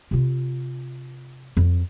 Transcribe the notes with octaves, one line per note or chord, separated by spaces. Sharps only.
C3 F4
F2